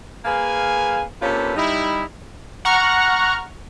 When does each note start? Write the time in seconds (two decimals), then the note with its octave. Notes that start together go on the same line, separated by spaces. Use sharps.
0.25 A#3 G#4 B4 F5 G#5
1.22 C3 A#3 C#4 F4 A4 B4
1.56 G3 D#4 E4
2.65 F#5 A#5 C#6 F6